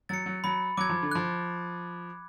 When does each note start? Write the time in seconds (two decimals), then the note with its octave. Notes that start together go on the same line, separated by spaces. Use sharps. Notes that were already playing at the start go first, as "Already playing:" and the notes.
0.09 F#3 A6 C#7
0.26 F#3
0.44 F#3 B5
0.77 F#3 D6 G#6
0.89 F3
1.02 D3
1.11 F3 F#6